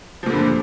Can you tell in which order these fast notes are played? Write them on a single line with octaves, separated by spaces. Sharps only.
F3 A#2 D3 G2